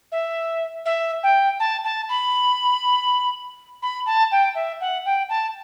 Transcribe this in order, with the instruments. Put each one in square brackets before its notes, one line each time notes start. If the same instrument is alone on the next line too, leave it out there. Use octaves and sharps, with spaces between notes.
[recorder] E5
E5
G5
A5
A5
B5
B5
A5
G5
E5
F#5
G5
A5